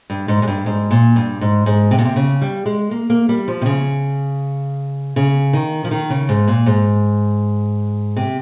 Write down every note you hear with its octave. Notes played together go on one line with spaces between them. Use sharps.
G2
G#2
G#2
G2
G#2
A#2
G2
G#2
G#2
C3
A#2
C3
C#3
G3
G#3
A#3
A#3
G3
F3
C3
C#3
C#3
D#3
F3
D#3
C#3
G#2
A#2
G#2
C3